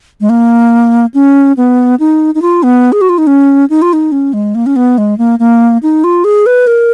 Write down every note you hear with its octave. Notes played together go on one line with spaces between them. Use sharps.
G#3
A#3
C#4
B3
D#4
D#4
F4
B3
G#4
F#4
F4
D#4
C#4
D#4
F4
D#4
C#4
G#3
A#3
C#4
B3
G#3
A#3
A#3
D#4
F4
G#4
B4
A#4